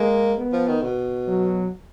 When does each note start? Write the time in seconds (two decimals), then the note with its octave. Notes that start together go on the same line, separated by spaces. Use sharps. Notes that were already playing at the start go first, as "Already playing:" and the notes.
Already playing: G#3 A#3
0.37 B3
0.53 F3
0.68 D#3
0.83 B2
1.28 F#3